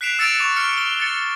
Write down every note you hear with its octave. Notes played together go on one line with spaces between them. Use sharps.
F#6 B6 C7 D7 E7 F7
E6 A6 C#7 D7 E7 F7
C#6 D6 F7
F6 C#7
G7
A6 C#7